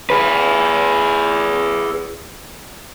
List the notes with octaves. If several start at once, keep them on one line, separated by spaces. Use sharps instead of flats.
G#4 B4